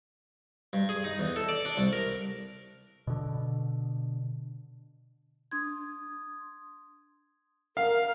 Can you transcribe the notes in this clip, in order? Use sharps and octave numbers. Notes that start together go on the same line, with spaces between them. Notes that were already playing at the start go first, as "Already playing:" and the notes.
G2
G#4
D#4
E2
A4
D5
D4
C2
A#4
B2 D3
D4 C6 D#6 G#6
A#4 F5